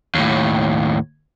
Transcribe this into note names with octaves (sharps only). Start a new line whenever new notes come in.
D#2 A2